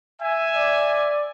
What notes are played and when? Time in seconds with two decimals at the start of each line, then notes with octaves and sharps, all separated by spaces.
0.20 E5 G#5
0.56 D5